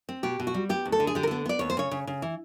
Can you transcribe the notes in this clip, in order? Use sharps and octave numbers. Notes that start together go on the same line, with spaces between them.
C4
B2 G4
B2
F#4
G3
B3 G4
D2
A4
D3
G#4
D3 G4
A#4
A4
B3
B3 D5
D#2 C#5
C5
C#3 C#5
C#3
C#3
E3